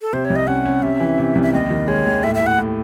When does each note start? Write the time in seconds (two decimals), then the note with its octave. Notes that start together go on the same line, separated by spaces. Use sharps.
0.02 A4
0.13 C3 C5
0.25 C#5
0.30 C2
0.36 D#5
0.47 C#4 F#5
0.66 C#4
0.82 C3 E5
1.00 E3
1.18 C3
1.35 C2
1.43 E5
1.53 D#2 D#5
1.70 D#3
1.88 G#3 C#5
2.06 D#2
2.23 A2 E5
2.35 E5
2.40 A2
2.46 F#5
2.58 A2